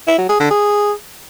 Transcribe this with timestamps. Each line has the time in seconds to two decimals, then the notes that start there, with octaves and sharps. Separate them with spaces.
0.08 E4
0.19 F#3
0.29 G#4
0.40 D3
0.51 G#4